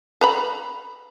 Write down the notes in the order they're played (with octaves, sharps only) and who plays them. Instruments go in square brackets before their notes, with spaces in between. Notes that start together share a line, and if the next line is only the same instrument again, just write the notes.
[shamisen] B4 A#5 B5